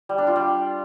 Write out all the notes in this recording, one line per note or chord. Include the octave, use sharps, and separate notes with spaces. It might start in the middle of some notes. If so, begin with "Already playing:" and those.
G3
D4
F4
G3